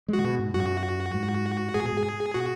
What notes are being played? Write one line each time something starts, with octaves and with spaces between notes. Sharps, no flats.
G#3 F#4
C#3
B2
G#2
F#2 F#4
G#2
G#2 G#4
B2
G#2
B2 F#4